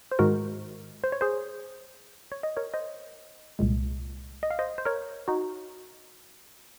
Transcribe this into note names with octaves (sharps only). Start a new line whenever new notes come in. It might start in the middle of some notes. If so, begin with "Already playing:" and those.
C5
G#2 D#3 G#3 F#4 A#4
C5
C#5
G#4 C5
C#5
D#5
A#4 C#5
C5 D#5
C2 A#2 G#3
D#5
F5
C5 D#5
C5
A#4 C#5
D#4 F#4